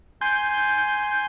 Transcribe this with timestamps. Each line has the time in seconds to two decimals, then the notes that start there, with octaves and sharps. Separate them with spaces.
0.21 G#5 C6 G6